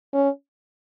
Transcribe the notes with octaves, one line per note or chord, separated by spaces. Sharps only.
C#4